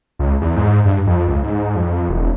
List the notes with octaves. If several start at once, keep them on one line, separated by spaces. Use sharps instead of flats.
C#2
E2
G#2
G2
F2
C#2
G#2
F2
E1